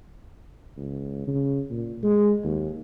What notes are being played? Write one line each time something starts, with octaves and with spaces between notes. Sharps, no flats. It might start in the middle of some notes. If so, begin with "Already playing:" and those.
C#2
C#3
A#2
G#3
D#2